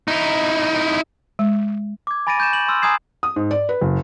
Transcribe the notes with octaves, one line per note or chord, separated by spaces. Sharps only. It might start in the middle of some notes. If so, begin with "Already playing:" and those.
D#4 E4
G#3
D6 G#6
G#5 B5 A6 A#6 D7 D#7
C#6 G6 A6 D#7 E7
F#7
C6 E6 F6
G#5 A#5 D#6 G#6 C7 E7
D#6
G#2
D5
B4
F#1